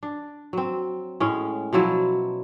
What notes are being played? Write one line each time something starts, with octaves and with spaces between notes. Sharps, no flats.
D4
F#3 C4
A2 G#3 C#4
B2 F3 F#3 E4